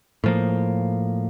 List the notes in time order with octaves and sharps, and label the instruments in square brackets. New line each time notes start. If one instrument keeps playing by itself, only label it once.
[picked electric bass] A2 F3 A#3